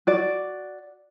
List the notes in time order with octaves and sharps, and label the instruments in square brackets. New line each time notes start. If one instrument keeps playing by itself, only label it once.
[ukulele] F#4 D5